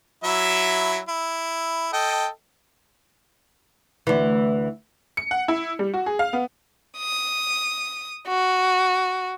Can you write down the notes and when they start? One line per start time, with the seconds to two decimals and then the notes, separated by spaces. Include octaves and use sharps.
0.24 F#3 E4 E5
1.08 E4
1.93 A4 D#5 G5
4.07 D2 E3
5.17 C#7
5.31 F#5
5.48 E4
5.79 G3
5.94 F#4
6.06 G#4
6.19 F5
6.33 B3
6.97 D#6
8.27 F#4